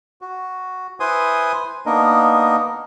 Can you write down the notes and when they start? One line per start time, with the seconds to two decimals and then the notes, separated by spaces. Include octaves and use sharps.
0.21 F#4
1.00 E4 B4 C5 G#5 C6 D#6
1.86 A#3 B3 D4 D#4 A#4 D#5